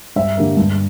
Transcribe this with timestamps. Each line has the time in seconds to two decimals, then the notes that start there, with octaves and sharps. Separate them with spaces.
0.16 G2 E5
0.37 D3 G3 A#3
0.57 G2